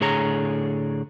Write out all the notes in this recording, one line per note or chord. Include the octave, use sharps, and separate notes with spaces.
A2 D3 G#4 C#5 A#5